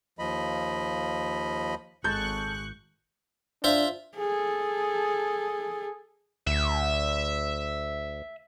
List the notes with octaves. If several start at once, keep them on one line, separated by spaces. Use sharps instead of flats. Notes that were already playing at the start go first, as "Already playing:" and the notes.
D#2 F3 D#5 B5
G#1 G#3 A4 C#6 F#6 G6
D4 F4 C5 E5
G#4 A4
D2 E5